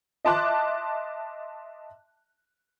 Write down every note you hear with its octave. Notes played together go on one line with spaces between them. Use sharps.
D#5 E5 A5 C6 D6 F#6